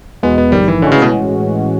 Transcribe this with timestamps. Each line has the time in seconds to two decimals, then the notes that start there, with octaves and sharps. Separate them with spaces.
0.23 E2 B2 G#3 B3
0.38 B3
0.52 A#1 G#2 D#3 G3
0.68 E3
0.82 A2 D3 E3 G#3 C#4 F#4
0.92 C#3
1.02 B2